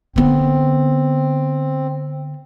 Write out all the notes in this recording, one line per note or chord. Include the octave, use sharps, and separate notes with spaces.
D3 B3 C4